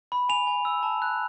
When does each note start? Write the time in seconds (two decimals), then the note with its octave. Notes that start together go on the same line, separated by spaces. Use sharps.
0.12 B5
0.29 G#5 F7
0.47 G#5
0.65 E6
0.83 A5
1.02 F#6